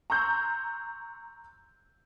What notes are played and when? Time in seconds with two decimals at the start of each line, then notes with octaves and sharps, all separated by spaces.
0.10 A#5 C6 C#6 E6 F#6 G6